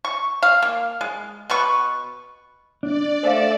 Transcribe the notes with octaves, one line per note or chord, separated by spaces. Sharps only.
C#6
F5
A#3
G#3
B2 B4 C#6
D4 D5
A3 C5 F5